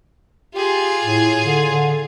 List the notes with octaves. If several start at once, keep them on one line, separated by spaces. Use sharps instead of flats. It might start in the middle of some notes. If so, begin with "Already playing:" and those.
F4 G4 G#4
A2
D3
D3